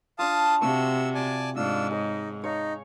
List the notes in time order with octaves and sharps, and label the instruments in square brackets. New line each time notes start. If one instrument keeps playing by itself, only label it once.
[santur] D4 F4 [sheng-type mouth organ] F5 A5 D#6
[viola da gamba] C3 F#4 [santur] C#6 [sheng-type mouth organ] E6
[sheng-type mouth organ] D5 G#5 A5
[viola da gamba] G#2 [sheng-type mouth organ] D4 F4 E6
[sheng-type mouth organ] D#4 [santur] G#4 C#5
[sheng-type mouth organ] D#4 [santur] C#5 F5